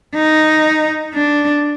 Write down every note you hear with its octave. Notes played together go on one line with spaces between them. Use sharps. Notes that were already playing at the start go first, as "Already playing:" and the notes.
D#4
D4